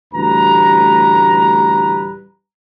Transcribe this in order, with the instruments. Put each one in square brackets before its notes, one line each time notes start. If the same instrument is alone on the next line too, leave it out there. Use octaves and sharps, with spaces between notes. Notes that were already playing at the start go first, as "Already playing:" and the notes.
[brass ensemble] A1 D2 G3 B4 A#5